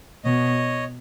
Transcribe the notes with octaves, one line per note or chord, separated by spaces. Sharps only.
B2 C#5 D#5